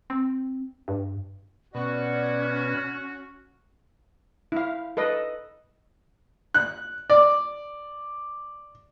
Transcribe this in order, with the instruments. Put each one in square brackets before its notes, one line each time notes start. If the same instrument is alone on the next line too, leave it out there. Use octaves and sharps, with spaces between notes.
[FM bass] C4
G2
[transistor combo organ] B2 [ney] C#4 [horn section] F#4 [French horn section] D5
[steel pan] E4 F5
A4 B4 D#5
[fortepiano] F#6
D5